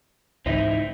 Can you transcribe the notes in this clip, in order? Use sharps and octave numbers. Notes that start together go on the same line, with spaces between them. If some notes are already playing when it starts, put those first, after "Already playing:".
C#2 G#2 E3 C4 D#4 E4